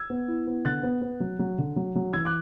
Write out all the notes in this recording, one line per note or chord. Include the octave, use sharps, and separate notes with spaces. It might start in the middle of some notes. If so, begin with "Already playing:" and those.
Already playing: E6 G#6
B3
E4
B3
D3 F#6 A6
B3
B3
F#3
F#3
D3
F#3
F#3
E3 E6 G#6
D6 F#6